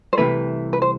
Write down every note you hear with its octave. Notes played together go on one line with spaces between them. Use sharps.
C5
C2 C3 E3 A3 B4
B4
C5